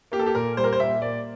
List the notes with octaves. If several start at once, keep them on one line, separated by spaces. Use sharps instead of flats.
A#3 G4
A4
G4
A#2 A#4
G3 C5
A#4
C5
A#2 E5
A#3 D5